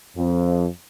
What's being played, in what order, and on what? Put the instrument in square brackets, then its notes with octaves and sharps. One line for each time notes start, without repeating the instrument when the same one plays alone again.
[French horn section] F2